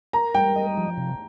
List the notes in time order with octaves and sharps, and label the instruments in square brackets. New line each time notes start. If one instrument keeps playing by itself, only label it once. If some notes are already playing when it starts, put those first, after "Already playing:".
[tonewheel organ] A#4 [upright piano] A#5
[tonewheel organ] G3 [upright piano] G5
[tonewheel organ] D#5
F3
C3